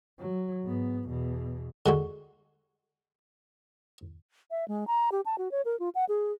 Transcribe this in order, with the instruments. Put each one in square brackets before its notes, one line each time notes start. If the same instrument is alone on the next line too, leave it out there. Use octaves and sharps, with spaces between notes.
[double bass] F#3
G#2 B3
E2 B2
[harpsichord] D3 G#3 F#4
[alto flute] E5
G#3
A#5
G4
A5
F#4
C#5
A#4
F4
F#5
G#4